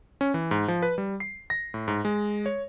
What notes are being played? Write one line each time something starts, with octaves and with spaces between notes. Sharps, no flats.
C#4
E3
G#2
F3
B4
G3
C7
A#6
A2
G#2
G#3
C#5